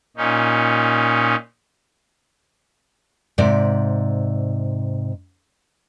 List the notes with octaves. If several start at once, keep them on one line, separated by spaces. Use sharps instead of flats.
A#2 C#4 D#4
G#2 C3 D5